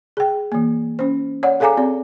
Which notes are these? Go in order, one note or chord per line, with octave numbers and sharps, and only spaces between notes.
G#4 G5
E3 A#3
C#4 C5
C#5 D5 F#5
G#4 A4 F5 G#5 A#5 D6
C4 D5